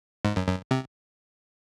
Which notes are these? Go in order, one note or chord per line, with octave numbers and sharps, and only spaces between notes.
G#2
F#2
F#2
C3